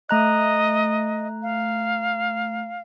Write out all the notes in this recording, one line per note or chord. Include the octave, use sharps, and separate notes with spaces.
A3 D#5 A#5 F#6
F5